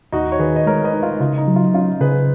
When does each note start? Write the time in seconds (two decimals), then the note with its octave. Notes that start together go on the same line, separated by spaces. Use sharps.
0.12 D#2 D#4 F#4
0.32 C#5
0.39 D#3 G#4 B4
0.56 D#5
0.67 G#3 A#4 C#5
0.84 B4 D#5
0.93 D#4
1.03 F4
1.20 C#3 F4
1.38 D#4
1.47 F#3
1.56 F4
1.74 C#4 F4
2.01 C#3 G#4 B4